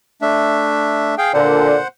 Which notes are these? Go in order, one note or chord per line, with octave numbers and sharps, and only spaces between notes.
A3 D4 E5
G#4 F5 G5
A#2 D3 C5 F#5